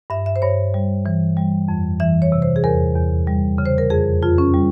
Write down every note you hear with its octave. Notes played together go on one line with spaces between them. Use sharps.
G2 E5
E5
C5
G2 C#5
G3
E3
G3
F2
E3 E5
C#5
C3
C5
G#4
E2 A#4
E2
G3
C#3
C5
A#4
F2 G#4
F2 F4
C#4
G3